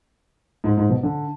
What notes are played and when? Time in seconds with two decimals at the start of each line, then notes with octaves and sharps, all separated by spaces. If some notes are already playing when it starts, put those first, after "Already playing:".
0.64 G#2
0.77 G#2
0.89 B2
1.03 D3